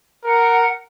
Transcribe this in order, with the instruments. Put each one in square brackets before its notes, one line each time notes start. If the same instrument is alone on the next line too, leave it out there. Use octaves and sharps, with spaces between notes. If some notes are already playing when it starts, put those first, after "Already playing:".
[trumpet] A#4 [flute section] F#5